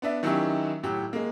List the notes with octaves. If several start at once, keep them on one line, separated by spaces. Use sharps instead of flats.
B3 D4 E5
D#3 F#3 C#4 D#4 E4 G4
A2 F#3 G4
G#3 A#3